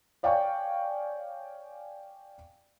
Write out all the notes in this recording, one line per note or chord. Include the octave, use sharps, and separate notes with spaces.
C#5 D5 F5 G5 G#5 C#6